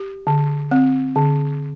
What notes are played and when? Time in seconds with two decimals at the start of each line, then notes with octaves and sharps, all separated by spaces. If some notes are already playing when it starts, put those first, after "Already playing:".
Already playing: G4
0.27 D3
0.71 C4
1.16 D3